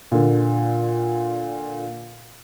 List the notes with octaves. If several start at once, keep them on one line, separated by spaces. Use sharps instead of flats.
A#2 D3